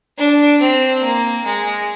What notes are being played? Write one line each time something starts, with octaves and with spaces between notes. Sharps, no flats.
D4
C4
A#3
G#3